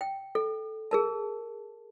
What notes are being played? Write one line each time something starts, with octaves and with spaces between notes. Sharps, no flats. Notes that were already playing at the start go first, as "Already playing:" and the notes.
G5
A4
G#4 A#4 A5